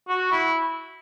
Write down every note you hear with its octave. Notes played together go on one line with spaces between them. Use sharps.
F#4
E4